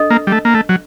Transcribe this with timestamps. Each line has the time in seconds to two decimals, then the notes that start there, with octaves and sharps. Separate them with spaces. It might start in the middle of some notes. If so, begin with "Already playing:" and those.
Already playing: D4 A4 D#5
0.10 A#3
0.27 G3
0.32 A3
0.45 A#3
0.54 A3
0.69 F#3